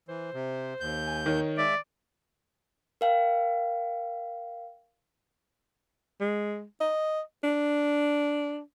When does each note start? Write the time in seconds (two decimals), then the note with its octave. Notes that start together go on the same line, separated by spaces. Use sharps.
0.09 E3 C5
0.34 C3
0.80 D#2 G6
1.06 G#5
1.26 D#3 C#5
1.58 G#3 D5 E5
3.01 A#4 F5 G5
6.21 G#3
6.80 D#5
7.44 D4